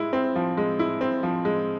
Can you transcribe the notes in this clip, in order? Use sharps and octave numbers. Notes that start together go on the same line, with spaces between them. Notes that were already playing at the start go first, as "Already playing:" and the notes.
Already playing: G#3 E4
C4
F3
G#3
E4
C4
F3
G#3